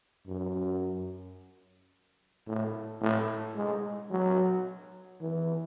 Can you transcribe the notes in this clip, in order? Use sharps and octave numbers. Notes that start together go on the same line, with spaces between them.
F#2
A2
A2
G#3
F#3
E3